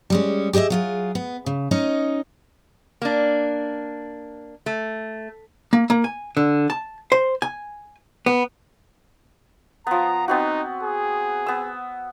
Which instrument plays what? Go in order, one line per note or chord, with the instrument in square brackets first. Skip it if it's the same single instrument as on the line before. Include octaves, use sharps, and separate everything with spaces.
[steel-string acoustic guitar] G3 G#3 C#4
G4 G#4 C#5 D#5 E5
F#3 F4 G#4
B3
C#3
C#4 D#4 D#5
[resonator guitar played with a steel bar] A#3 D4
A3
[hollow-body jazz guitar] A#3
A#3
G#5
D3
A5
C5
G#5
B3
[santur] F3 B3 [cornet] A#5
[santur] B3 C4 F#4 [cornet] D#4
[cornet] G#4
[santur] B3 E6